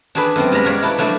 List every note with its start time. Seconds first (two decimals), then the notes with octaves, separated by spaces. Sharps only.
0.15 D4 F#4 G#4 A4 B4
0.36 F#2 B3 C4
0.52 G3 G#3 D5 A#5 B5
0.65 F#4 A#4 C#5 D5 F5
0.82 E4 A4 B4 C#5 D5
0.98 F3 F#3 A3 D4 E4 F#4